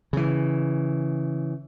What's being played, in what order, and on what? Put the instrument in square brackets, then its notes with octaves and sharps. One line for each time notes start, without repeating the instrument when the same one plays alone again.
[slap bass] C#3 E3